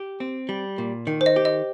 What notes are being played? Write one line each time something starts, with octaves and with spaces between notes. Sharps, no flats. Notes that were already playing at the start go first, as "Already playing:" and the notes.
Already playing: G4
C4
G3
A#2
D#3
C5
D#5
G4
D#5